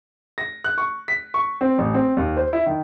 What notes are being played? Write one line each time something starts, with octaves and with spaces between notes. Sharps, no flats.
A#6
F#6
C#6
B6
C#6
C4
A1
C4
D#2
C5
E4
D#3